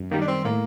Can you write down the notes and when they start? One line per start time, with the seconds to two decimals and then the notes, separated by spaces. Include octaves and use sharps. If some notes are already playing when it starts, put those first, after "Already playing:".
Already playing: F#2
0.11 D#3 G3 A#3
0.21 D4
0.28 C4
0.45 A2 A#3